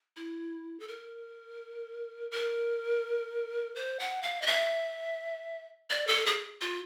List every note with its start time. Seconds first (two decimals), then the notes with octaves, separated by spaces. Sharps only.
0.16 E4
0.80 A4
0.88 A#4
2.31 A#4
3.76 C5
3.99 F#5
4.23 F5
4.42 D#5
4.47 E5
5.90 D5
6.07 A4
6.26 G#4
6.61 F4